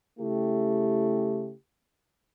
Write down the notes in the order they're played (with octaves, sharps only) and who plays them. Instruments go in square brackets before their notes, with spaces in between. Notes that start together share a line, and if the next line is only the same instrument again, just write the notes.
[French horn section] C#3 A3 E4 G4